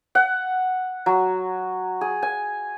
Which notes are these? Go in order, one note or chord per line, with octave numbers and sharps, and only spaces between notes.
F#5
F#3
G#4
G#5